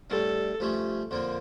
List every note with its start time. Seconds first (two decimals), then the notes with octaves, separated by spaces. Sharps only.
0.10 A2 G3 D4 A4
0.60 G2 F3 A3 C#4
1.11 F2 D3 F3 A#3